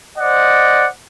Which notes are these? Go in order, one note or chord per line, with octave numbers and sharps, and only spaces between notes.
C5 D5 D#5 F#5